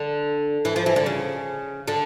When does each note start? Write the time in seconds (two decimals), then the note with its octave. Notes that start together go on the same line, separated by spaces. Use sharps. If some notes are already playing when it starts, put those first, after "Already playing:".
Already playing: D3
0.65 E3
0.76 F3
0.86 E3
0.96 D3
1.06 C#3
1.88 D3